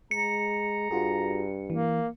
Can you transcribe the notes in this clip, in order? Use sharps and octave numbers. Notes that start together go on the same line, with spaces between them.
G#3 A#5 C#7
G2 F4 F#4 G#4
E3 A#3